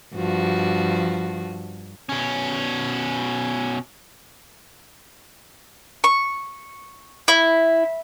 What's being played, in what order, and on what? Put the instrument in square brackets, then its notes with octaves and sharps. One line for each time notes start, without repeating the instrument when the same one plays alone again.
[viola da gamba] G2 F3 F#4
[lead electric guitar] B2 C#4
[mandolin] C#6
E4